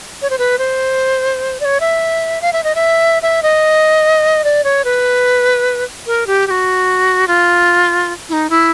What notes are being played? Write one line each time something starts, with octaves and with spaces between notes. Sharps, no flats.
C#5
C5
B4
C5
D5
C#5
E5
F5
E5
D#5
E5
E5
D#5
D5
C#5
B4
A#4
G4
G4
F#4
F4
E4
D#4
E4